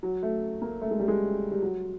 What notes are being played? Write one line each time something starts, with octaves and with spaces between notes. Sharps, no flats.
F#3
A3
A#3
A3
G#3
G3
G#3
G3
F#3